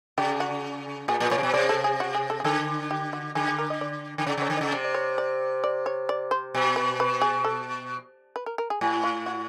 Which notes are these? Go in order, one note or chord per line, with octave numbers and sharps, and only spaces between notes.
C#3 G4
F#4
A#2 G#4
A#2
A#2 C#5
C3
B2
C3 D5
A4
G#4
F#4
G#4
A4
G#4
D3 A4
G4
F#4
D3 G#4
G#4
A#4
D#5
D5
D3
C#3 D5
C#3 C#5
D3
C#3 D#5
C3 D5
D5
C#5
D5
D5
C#5
D5
C5
B2
B4
B4
G#4
A4
B4
A#4
A#4
G#4
A2 G4
F4
F#4